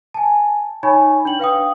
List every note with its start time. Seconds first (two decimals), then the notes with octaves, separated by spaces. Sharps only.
0.14 G#5 A5
0.83 D#4 C#5 G#5 B5 C#6
1.25 D4 G5 F#7
1.39 B4 F5 G5 D#6